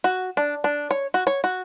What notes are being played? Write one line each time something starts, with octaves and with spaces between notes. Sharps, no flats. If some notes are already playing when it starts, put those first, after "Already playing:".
F#4
D4
D4
C#5
F#4
C#5
F#4